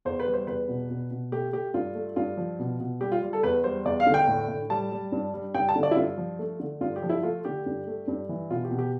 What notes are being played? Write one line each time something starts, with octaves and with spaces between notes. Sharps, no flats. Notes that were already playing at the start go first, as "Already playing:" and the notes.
E2 C5
B4
G3
C5
E2 B4
B2
B2
B2
A3 G4
A3 G4
G2 F4
A3
G2 F4
F3
B2
B2
G3 G4
F4
G3
A4
E2 B4
G3 C5
E2 D5
F5
D3
G5
A2
A2
G3 A5
G3
G2
G3
G2 G5
A5
D3
D5
E4
G2 F4
F3
A3
D3
G2 F4
G4
F3
E4
A3 F4
D3 G4
G2
A3
G2
E3
B2 F4
G4
B2
G4